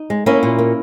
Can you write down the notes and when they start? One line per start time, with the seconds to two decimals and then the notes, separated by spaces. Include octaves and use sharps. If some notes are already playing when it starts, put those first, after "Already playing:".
Already playing: D#4
0.10 G#3
0.26 A#3 C#4 E4
0.43 A#2
0.59 A#3